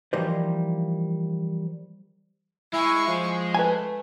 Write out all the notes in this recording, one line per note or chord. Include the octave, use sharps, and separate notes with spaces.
E3 F3 G3 A#3 D#4 C5
G#3 E4 G#5 C#6
F3
A3 B4 G#5